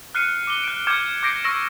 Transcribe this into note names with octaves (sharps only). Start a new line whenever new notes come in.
F6 F#6 C7 C#7 D#7
D6 G7
F#6 D7
D6 F6 G6 G#6 C#7 E7
D6 G6 A#6 C7 D7
C#6 E6 F6 A#6 D7 E7